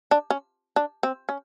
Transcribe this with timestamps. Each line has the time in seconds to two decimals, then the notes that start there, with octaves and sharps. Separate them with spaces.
0.11 D4
0.30 C#4
0.76 D4
1.03 C4
1.29 C#4